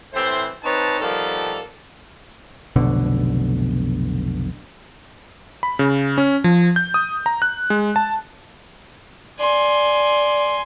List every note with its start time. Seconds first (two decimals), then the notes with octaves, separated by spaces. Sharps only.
0.14 A2 E3 A3 C4 C5
0.63 C4 D#4 B4 C#5 A5
1.00 D#3 F3 G3 A#3 B3 A4
2.76 F1 B1 B2 D3
5.63 B5
5.79 C#3
6.18 C#4
6.44 F3
6.76 G6
6.94 D#6
7.26 A#5
7.42 F#6
7.70 G#3
7.96 A5
9.40 D5 G#5 C6